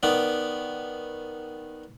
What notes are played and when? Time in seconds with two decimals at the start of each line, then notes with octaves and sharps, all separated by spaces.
0.03 D#3 B3 D5